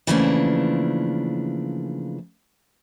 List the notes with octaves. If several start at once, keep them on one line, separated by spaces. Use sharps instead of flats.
C#3 E3 F3 A3 A#3 D4